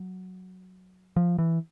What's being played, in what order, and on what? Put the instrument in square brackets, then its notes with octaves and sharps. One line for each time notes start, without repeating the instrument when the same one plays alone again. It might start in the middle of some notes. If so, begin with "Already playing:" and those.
Already playing: [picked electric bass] F#3
F3
E3